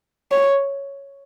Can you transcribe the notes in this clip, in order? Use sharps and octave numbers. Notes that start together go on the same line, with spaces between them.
C#5